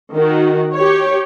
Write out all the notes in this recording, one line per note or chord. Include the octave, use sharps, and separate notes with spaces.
D#3 F#4
G4 C#5